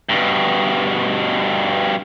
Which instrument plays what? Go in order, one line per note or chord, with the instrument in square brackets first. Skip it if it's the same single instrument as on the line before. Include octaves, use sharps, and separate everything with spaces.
[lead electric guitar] G2 B2